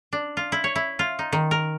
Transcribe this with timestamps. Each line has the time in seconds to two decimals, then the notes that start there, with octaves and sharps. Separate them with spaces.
0.13 D4
0.37 F4
0.52 E4
0.64 C#5
0.76 E4
0.99 F4
1.19 D#4
1.33 D#3
1.51 A#4